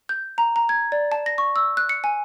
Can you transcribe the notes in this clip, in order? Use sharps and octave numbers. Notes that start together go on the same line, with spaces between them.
G6
A#5
A#5
G#6
D5
A5
A#6
C#6
E6
F#6
C#7
G#5